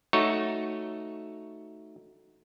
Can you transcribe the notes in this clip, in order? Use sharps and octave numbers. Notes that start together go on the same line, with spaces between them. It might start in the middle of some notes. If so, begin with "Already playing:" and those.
A3 D#4 F#4 C#5